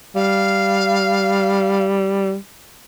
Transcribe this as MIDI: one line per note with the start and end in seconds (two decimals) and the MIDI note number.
0.15 2.35 55
0.15 1.84 77